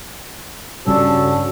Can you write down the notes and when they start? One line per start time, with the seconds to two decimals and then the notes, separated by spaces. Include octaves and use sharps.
0.87 G2 C#3 G3 C#4 D4 F#4 A4